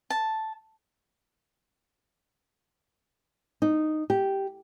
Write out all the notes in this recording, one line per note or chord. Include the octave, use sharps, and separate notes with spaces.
A5
D#4
G4